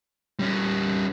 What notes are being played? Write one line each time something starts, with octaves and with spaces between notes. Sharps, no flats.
G3 C#4